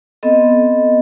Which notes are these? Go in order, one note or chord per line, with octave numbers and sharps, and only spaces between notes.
B3 C4 A4 D#5